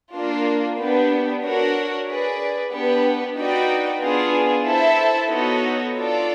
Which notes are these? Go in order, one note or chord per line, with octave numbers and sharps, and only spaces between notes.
A#3 D4 F4
B3 D4 G4 B4
D4 F#4 A#4 C#5
G#4 B4 D5
B3 D4 G4 B4
D#4 F#4 B4 D5 G5
B3 D4 F4 G#4
E4 A4 C5 E5 A5
B3 D#4 F#4 A4 C#5
D4 F4 A4 D5